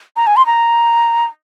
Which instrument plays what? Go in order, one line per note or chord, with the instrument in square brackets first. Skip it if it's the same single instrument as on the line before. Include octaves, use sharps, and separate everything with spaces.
[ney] A#5
G#5
C6
A#5